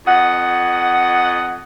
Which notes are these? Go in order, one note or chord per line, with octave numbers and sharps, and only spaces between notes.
F2 D#5 F#5